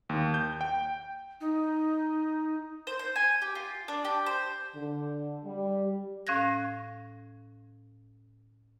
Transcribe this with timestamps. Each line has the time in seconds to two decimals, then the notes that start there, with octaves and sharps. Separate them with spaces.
0.09 D#2
0.34 G6
0.61 G5
1.41 D#4
2.87 C5
2.99 C5
3.16 G#5
3.42 G4
3.55 F4
3.88 D4
4.05 G4
4.26 C5
4.75 D3
5.44 G3
6.27 A2 C#4 F5 F#6 G#6 A#6